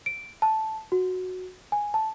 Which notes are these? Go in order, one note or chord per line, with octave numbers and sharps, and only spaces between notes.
D7
A5
F#4
G#5
A5